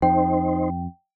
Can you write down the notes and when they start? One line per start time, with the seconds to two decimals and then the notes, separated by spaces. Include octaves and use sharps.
0.02 F2 D#4 C5 G5